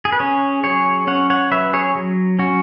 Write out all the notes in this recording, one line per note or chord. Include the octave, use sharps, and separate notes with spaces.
G#4
B4
C#4 G#4 C#5
F#3 G#4 C#5
C#4 C#5 F#5
C#5 F#5
F#3 B4 E5
G#4 C#5
F#3
C#4 F#4